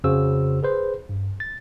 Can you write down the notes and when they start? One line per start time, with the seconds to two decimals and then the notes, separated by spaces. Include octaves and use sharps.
0.04 F2 C#3 F#4 C5 E6
0.63 G#4 B4 C5
1.09 G2
1.40 A6